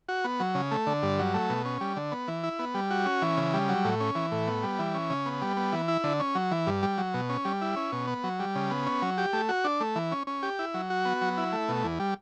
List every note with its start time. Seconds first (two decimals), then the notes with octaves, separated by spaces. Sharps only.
0.09 F#4
0.24 B3
0.40 F#3
0.55 C#3
0.71 A3
0.87 D3
1.03 G2
1.19 F#3
1.34 A3
1.50 B2
1.65 C#4
1.81 G3
1.96 D3
2.12 B3
2.28 E3
2.44 E4
2.59 B3
2.74 G3
2.91 F#4
3.06 C#4
3.22 E3
3.37 C#3
3.54 G3
3.69 F#3
3.85 A2
4.00 C#4
4.15 E3
4.32 A2
4.47 B3
4.63 G3
4.79 E3
4.94 C#4
5.10 C#3
5.26 B3
5.42 G3
5.57 B3
5.72 E3
5.88 E4
6.04 D3
6.20 C#4
6.35 F#3
6.51 E3
6.67 G2
6.83 G3
6.98 F#3
7.14 B2
7.29 C#4
7.45 G3
7.61 E4
7.76 C#4
7.92 B2
8.07 B3
8.24 F#3
8.40 G3
8.55 C#3
8.71 B3
8.87 C#4
9.02 F#3
9.18 G4
9.33 A3
9.49 F#4
9.64 D4
9.80 A3
9.96 E3
10.12 C#4
10.27 C#4
10.43 G4
10.59 E4
10.74 F#3
10.90 F#4
11.05 B3
11.21 F#3
11.37 E4
11.52 A3
11.69 B2
11.84 E2
12.00 G3